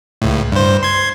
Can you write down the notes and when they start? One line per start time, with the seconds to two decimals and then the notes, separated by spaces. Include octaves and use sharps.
0.22 C#2 A2
0.52 G2 C5
0.83 C6 G#6